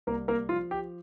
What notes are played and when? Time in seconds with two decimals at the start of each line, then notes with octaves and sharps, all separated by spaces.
0.07 C2 A#3 A#4
0.28 A#3 A#4
0.49 F3 F4
0.71 G4